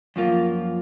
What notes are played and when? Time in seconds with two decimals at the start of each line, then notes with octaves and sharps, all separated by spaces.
0.16 F#2 F3 A#3 F4